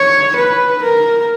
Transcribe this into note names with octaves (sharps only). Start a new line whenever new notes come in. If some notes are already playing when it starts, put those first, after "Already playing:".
Already playing: C#5
B4
A#4